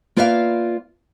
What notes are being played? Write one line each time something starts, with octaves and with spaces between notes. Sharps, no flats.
A#3 F4 B4 D5 E5 F5